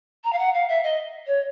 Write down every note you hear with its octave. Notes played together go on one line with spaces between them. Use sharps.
A#5
F5
F#5
F5
E5
D#5
C#5